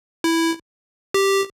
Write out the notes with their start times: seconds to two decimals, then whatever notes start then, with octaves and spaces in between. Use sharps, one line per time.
0.24 E4
1.14 G4